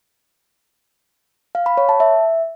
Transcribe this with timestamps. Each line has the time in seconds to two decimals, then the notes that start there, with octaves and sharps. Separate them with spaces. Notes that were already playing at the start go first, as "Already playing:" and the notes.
1.55 F5
1.66 B5
1.77 C#5
1.89 A5
2.00 E5